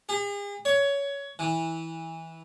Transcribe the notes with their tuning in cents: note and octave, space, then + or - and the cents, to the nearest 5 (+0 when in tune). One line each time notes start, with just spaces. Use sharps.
G#4 -40
C#5 +15
E3 -15